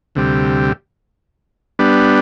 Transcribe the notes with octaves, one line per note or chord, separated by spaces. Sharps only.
D2 C3 G3
G3 B3 D4